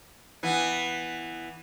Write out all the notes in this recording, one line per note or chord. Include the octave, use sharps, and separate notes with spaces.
E3 B3